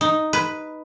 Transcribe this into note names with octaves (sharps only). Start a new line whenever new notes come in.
D#4
B4